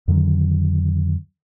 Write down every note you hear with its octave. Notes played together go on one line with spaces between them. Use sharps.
F2 D3 D#3 F#3